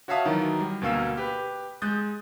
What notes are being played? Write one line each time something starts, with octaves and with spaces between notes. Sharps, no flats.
F#4 C#5 E5 F5 A5 D#6
D#3 E3 F#3 A#4
G3
D2 B2 A#3 F5 E6
G4 B4
G#3 D#6 F#6 G6 A6